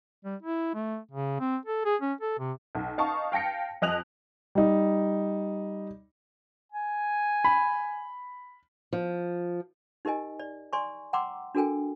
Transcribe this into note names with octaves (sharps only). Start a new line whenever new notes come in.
G3
E4
A3
C#3
C4
A4
G#4
C#4
A4
C3
B1
D#4 F5 A5 C#6
F5 G5 A5 A#6 C#7
F2 D#5 F#6 F7 F#7
G3 D#4
G#5
B5
F3
D#4 G4 A#4 D#5 G#5
D5
D5 G#5 C6 C#6
F#5 G5 A#5 C6 D6 E6
D4 F#4 A4 A#4 G5 G#5